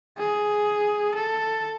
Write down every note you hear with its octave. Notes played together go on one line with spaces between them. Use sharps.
G#4
A4